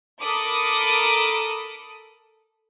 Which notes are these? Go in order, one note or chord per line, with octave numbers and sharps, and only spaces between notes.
A4 A#4 B5 D6 D#6